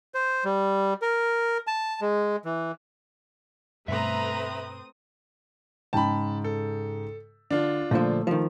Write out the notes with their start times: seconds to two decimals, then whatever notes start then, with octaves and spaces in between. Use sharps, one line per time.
0.14 C5
0.45 G3
1.02 A#4
1.67 A5
2.01 G#3
2.45 E3
3.88 G2 B2 A3 C4 B4 E5 A#5 D#6
5.93 G#2 C#3 G5 A5 B5
6.44 A4
7.51 D3 D4 F4
7.91 A#2 D3 F3 A3
8.27 D#3 F3